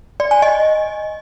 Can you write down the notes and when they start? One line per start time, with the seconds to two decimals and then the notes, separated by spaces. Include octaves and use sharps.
0.20 D5
0.31 G#5
0.42 D#5